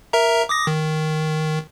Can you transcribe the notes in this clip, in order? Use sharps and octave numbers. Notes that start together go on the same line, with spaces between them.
A#4 E5 A#5
D6 D#6 A#6
D#3